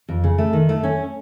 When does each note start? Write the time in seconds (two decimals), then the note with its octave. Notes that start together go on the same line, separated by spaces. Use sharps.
0.09 F2
0.24 C#3
0.38 A3
0.53 D#3
0.69 A3
0.84 C#4